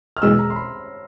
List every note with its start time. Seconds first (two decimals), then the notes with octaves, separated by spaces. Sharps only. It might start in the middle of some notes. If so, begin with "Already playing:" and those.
0.17 F6
0.22 E2 B2 G#3 E6
0.39 A#5
0.50 C6
0.56 B5